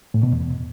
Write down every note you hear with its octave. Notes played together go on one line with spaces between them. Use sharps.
A2
B2
E2